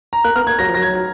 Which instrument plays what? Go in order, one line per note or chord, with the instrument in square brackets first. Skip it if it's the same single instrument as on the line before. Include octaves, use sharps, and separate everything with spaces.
[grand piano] A#5
[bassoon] A#3 [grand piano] F#6
[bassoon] B3 [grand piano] F6
[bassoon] A#3 [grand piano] G#6
[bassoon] F#3 [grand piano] A#6
[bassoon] F3
[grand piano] A#6
[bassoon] F#3 [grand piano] G#6